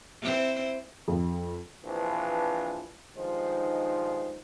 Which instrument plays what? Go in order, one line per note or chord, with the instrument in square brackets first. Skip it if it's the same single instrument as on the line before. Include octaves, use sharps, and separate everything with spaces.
[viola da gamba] C4 E4 C5
[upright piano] F2
[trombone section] A#1 E3 F3 C4 D4 B4
G2 D#3 F3 G#3 D#4 C5